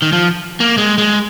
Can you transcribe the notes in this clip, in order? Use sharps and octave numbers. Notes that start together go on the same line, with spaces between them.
D#3
F3
A#3
G#3
G#3